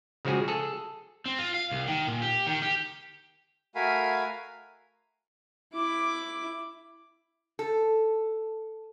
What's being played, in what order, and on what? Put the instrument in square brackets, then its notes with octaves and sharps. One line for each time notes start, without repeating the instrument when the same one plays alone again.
[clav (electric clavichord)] C#3 F3 G#3 F#4 G#4
G#4 A4
[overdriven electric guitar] C4
F4
F5
C2
D#3
A#2
G4
D#3
G4
[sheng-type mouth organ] A3 F#4 A#4 F5 G#5 B5
[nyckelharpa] E4 D6
[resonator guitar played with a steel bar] A4